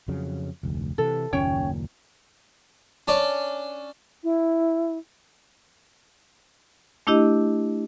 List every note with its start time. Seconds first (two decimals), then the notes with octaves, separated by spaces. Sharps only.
0.08 F2 C#3 F#3
0.63 F1 D2
0.98 C3 E3 A4
1.33 F#1 D#2 A#2 C#4 C#5 G5
3.08 C#4 D4 D5 C#6
4.24 E4
7.07 A3 D4 E4 G4 D#5